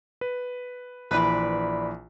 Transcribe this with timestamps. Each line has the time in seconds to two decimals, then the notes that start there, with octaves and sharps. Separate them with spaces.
0.21 B4
1.11 A#1 E3 B4 C5 D5